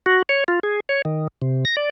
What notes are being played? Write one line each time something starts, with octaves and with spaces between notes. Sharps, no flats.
F#4
C#5
F4
G#4
C#5
D#3
C3
A#6
D5